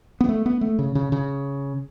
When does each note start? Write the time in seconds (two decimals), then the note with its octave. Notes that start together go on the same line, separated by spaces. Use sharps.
0.21 B3
0.29 A3
0.46 B3
0.61 A3
0.79 C#3
0.95 C#3
1.12 C#3